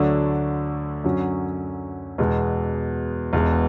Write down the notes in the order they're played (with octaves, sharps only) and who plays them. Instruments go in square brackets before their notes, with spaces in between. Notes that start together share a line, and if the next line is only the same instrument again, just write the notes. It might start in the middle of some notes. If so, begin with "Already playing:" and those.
Already playing: [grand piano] D2 D3 F#3 A3 D4
F#2 D3 F#3 C#4
E2 B2 G#3
E1 E2 B2 G#3